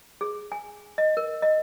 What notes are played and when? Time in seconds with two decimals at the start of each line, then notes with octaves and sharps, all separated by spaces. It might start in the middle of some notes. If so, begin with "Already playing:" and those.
0.21 G#4
0.52 G#5
0.98 D#5
1.17 A#4
1.42 D#5